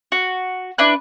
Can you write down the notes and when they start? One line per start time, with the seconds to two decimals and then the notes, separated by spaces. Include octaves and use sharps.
0.12 F#4
0.78 D4 E4 B4 F#6